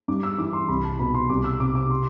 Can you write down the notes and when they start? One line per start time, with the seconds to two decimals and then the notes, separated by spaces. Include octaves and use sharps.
0.08 G2 D6
0.23 E6
0.38 E3 D6
0.53 C6
0.68 C2 B5
0.84 A5
0.99 B2 B5
1.14 C6
1.29 C2 D6
1.44 E6
1.60 C3 D6
1.75 D6
1.90 C6